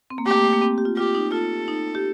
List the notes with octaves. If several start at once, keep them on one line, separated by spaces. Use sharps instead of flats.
C4
A#3
A3 G4
A#3
A3
A#3
C4
G4
F4
F4 G4
D#4
F4 A4
D#4
G4